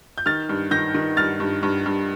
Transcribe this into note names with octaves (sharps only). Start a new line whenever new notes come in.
G6
D#3 F6 A6
G2
D#3 G6 A#6
D#3
G2 F6 A6
G2
G2
G2